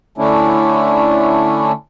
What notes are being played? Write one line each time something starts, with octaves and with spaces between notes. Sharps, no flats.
D3 A3 C#4 D4 E4